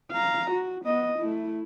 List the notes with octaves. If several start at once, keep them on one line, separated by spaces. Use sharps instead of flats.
F5 A#5
F#4
B3 D#5
A3 E4